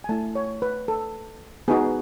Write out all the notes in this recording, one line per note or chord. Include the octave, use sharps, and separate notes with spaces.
G#5
A3 E4 A5
C#5
B4
A4
B3 D#4 F#4 G#4